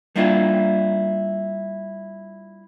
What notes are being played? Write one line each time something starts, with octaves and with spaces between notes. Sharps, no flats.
G3 A#3 D4 E4 F4